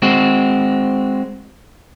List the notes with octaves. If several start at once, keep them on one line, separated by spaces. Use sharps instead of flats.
G#3 C4 F#4